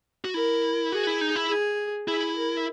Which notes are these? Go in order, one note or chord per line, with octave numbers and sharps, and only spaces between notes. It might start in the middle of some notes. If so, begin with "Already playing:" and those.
F#4
E4 A#4
F#4 G#4
E4
D#4
E4
G#4
E4 G#4
A#4